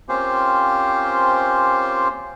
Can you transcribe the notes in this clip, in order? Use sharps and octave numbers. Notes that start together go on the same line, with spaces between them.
A#3 C4 C#4 F4 G4 C5